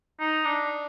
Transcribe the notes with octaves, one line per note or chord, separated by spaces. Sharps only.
D#4
D4